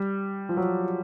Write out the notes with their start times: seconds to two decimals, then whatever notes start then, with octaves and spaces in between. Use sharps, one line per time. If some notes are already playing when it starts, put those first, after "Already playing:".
Already playing: G3
0.49 F3
0.57 F#3